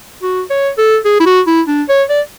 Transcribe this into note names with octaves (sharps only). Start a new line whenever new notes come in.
F#4
C#5
A4
G#4
E4
F#4
E4
D4
C#5
D5